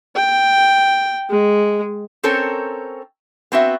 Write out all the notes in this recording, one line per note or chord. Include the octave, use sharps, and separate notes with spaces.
G5
G#3
C4 C#4 A4 A#4 C5 C#5
B3 C4 F#4 E5